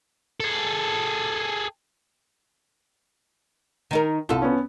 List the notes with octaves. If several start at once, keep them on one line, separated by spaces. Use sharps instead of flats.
G#4 A4
D#3 D#4 A#4
C2 F4 A4
B3 C#4